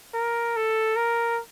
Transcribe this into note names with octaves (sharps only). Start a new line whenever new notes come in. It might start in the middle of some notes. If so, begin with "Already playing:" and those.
A#4
A4
A#4